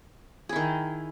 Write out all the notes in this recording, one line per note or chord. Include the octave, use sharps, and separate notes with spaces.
D#3 E4 G#4